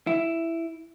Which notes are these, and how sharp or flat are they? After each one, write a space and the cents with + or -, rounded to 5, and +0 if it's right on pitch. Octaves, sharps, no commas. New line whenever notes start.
E4 +5